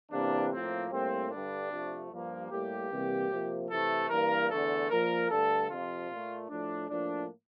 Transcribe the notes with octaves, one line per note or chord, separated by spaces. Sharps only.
E2 C3 E3 A#3 D4
A2 F3 A#3 C4
A2 G3 A#3 C4
G2 D3 G3 D4
C3 F3 A3
G2 F3 A#3
A2 G3 A#3 G4
C3 E3 G3 A#3
C3 F3 A#3
C3 E3 A3 A4
G2 E3 A#3 A#4
E2 D3 A3 A4
A#2 F3 A#3 A#4
G2 D3 A3 A4
F2 C3 F3 F4
A#2 A3
A2 F3 A3 D4
A2 F3 A#3 D4